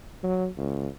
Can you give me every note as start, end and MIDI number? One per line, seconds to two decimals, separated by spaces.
0.23 0.47 54
0.57 0.88 37